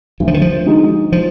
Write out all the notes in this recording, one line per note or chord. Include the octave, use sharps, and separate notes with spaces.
D2 F#3
F3
D#3
F3
D3 G#3 D#4 F#4
F3